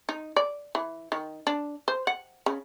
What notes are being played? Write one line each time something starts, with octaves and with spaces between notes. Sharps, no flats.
D#4
D5
E3
D#3
D4
C5
F#5
C#3